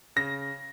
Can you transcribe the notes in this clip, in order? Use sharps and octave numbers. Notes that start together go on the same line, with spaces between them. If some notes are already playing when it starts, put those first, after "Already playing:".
C#3 A#6